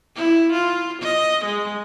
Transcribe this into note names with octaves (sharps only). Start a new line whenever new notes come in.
E4
F4
D#5
G#3